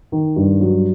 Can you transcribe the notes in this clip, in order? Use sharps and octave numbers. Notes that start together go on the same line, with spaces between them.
D#3
G2
F#3